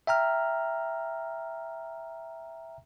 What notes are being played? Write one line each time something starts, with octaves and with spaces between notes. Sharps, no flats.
E5 G5 A#5 F6